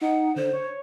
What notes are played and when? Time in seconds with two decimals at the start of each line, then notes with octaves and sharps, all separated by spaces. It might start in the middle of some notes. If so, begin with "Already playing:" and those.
0.01 D#4 F#5
0.36 D3 C5
0.53 C#5